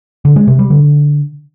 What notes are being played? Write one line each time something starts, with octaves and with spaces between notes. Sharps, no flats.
D3
G#3
C3
G3
D3